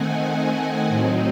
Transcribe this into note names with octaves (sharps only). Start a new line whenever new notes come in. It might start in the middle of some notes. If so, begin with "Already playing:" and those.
Already playing: D#3 A3 C4 D#4 F#5 G#5
A2 F#3 C4 D#4